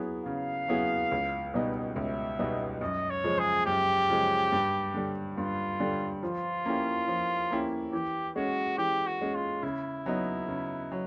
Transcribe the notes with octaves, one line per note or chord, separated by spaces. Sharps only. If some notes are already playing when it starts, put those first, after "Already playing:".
Already playing: F#3 B3 E4 G#4
C#3 F5
F#3 B3 E4 G#4
C#2
B2 G3 B3 D#4
C#2 E5
B2 G3 B3 D#4
F#2 D#5
C#5
C#3 F3 G#3
G#4
F#2 G4
C#3 F3 G#3
G2
D3 G3
G2 F4
D3 G3
F3 F4
A#3 C#4 E4 G4
F3
A#3 C#4 E4 G4
E3 G4
G#3 C#4 F#4
E3 G4
F#4
G#3 C#4
F4
C#3 E4
F#3 B3 D#4
C#3
F#3